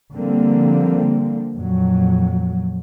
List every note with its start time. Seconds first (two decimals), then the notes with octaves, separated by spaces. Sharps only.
0.13 D3 F3 G3 A#3 C4
1.54 F2 A#2 F#3